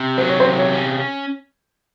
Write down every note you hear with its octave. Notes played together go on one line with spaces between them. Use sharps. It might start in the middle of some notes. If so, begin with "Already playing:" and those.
Already playing: C3
F#3 C5
C#5
C3 C5
C#5
C#4